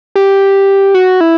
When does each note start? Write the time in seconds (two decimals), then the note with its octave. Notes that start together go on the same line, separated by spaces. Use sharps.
0.16 G4
0.94 F#4
1.21 E4